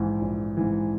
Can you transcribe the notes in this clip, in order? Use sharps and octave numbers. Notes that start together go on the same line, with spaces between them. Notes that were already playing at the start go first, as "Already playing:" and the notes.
Already playing: A#1 G#2 E3
A#1
G#2 E3